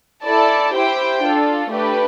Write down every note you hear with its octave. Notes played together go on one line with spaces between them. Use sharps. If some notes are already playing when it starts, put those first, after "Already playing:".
E4 A4 D5 A5
E4 G4 C5 G5
D4 F4 A4
A3 D4 G4 B4